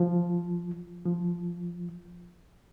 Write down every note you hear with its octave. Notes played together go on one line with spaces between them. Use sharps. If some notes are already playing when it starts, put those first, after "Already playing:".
Already playing: F3
F3